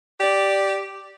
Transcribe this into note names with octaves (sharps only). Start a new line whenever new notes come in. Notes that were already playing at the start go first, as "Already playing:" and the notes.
G4 D5